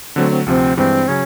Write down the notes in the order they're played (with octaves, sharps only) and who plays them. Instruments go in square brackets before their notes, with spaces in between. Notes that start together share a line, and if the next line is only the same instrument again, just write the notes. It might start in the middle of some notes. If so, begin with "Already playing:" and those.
[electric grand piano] D3 F#3 A3 [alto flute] C4
[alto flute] C4
[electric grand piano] D2 C3 F3 [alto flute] C4
[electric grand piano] G2 E3 G#3 [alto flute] C4
[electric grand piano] C#3 F#3 [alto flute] C#4